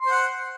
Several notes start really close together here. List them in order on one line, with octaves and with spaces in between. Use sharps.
C6 C5 F#5